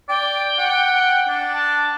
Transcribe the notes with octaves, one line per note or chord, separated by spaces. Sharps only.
D5 G5
F#5
D4
A5